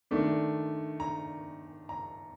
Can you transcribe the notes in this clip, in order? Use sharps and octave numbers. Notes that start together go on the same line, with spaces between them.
D#3 A3 D4
A#5
A#5